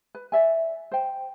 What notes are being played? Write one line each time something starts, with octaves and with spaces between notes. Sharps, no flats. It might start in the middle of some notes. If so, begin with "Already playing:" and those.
B4
D5 E5 G#5
C5 G5